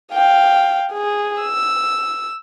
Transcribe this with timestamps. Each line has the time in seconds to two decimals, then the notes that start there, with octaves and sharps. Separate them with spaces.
0.13 F5 G5
0.92 G#4
1.42 E6